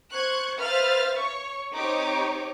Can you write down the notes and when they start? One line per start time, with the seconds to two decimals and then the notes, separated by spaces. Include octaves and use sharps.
0.12 C5 C#6 F#6 G#6
0.60 B4 C5 E5 F5 F6 A6
1.18 C#5 C#6
1.74 C4 D#4 G4 C#5 D6